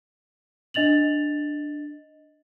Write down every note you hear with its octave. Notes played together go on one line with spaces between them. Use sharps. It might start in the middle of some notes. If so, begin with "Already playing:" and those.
D4 D#5 A6 F7 F#7